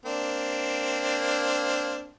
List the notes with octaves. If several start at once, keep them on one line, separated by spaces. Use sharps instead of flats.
A#3 C4 D4